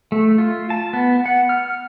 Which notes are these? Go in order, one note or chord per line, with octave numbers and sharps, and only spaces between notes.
A3
F4
A5
B3
F#5
F6